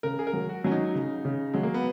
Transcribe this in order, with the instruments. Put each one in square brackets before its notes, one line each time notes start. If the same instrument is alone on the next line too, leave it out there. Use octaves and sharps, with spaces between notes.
[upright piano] C#3 [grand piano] A#4
[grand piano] G#4
A#4
[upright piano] F#3
[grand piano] F#4
[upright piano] F#3 [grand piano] C#4
[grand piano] D#4
[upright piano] C#3
C#3
[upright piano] F#3 [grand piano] G#3
[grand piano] A#3
B3